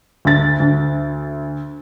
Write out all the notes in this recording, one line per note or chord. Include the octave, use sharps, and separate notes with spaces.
D2 A6
D2